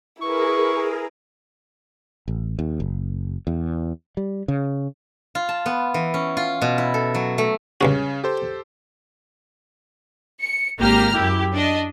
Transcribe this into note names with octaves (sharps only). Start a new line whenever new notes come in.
E4 G#4 A#4 B4 C#6
A1
D#2
F#1
E2
G3
C#3
F4
A5
B3
E3
C#4
F4
B2
E4
A4
F#3
A3
C#2 G2 C#3 C#4 F#4
G4 A4 C5
C#7
G#1 A#3 G4 A#5 F6
F#2 E4 G4
D4 D#5